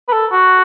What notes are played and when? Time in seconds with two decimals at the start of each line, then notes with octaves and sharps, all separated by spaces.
0.08 B4
0.13 A4
0.32 F#4